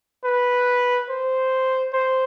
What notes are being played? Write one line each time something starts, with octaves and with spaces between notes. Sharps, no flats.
B4
C5
C5